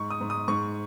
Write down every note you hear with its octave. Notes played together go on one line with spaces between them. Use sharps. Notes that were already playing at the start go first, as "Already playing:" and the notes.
Already playing: G#2 C#6
D#6
G#2
D#6
G#2 C#6